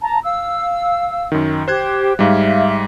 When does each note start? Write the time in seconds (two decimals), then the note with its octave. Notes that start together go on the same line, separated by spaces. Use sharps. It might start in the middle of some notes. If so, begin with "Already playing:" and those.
0.02 A5 A#5
0.23 F5 E6
1.32 F#2 D#3
1.68 G4 C5 F#6 G#6
2.19 G#2 G3 E5 F5